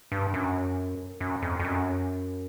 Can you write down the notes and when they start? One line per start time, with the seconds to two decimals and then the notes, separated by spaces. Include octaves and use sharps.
0.12 G2
0.34 F#2
1.21 F#2
1.42 F2
1.60 F2
1.65 F#2